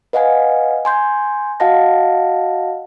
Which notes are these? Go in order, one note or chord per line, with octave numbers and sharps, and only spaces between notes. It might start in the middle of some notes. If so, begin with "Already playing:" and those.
B4 D#5 F5 F#5 G#5
G#5 C6 G6
F#4 D#5 F5 F#5 A5 A#6